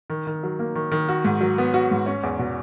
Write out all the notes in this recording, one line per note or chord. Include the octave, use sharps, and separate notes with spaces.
D#3
D#3
F#3
A#3
D#3
D#3
F#4
G#2
F#3
B3
F#4
G#2
C#4
E2
B2